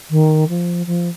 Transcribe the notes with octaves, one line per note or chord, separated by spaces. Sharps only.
D#3
F3
F3